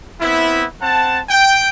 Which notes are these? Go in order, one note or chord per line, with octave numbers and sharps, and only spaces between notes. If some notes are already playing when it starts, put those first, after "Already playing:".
B3 C4 E4
C4 F#5 A5
G5